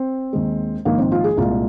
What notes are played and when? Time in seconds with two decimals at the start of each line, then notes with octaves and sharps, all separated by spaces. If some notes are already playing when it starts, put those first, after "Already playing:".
Already playing: C4
0.33 D#2 D#3 G#3
0.85 A#1 G#2 D#3 G#3 A#3
0.99 C4
1.12 F4
1.24 G#4
1.37 C2 A#2 G#3 F4